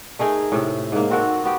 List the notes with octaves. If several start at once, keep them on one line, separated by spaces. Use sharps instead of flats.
A3 D#4 G#4 A#4
A2 C3
G#2 A#3
C4 F#4 A4 A#4
B3 F#4 G4